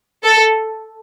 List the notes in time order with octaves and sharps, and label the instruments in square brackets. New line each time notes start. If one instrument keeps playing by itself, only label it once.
[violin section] A4